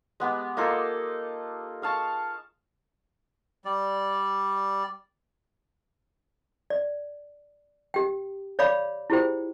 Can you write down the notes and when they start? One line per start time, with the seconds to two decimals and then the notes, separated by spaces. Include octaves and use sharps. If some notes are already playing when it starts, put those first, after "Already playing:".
0.20 G#3 B3 G4
0.57 A#3 D#4 F4 A4
1.82 G#4 F5 A5 C#6
3.65 G3 D5
6.70 D5
7.94 G4 G5
8.59 C#5 D5 F5 B5 D6
9.10 E4 F4 G4 G#4 C5 G5